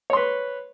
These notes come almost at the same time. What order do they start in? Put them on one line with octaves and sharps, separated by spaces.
C#5 C6 B4